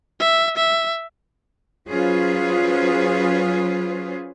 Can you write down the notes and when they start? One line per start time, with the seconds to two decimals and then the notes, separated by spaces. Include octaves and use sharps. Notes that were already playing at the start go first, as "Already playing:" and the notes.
0.20 E5
0.57 E5
1.88 F#3 C#4 F4 G#4 B4 C5